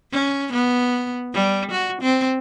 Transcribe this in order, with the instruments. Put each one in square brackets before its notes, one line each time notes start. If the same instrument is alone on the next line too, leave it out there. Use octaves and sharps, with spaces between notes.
[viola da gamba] C#4
B3
G3
F#4
C4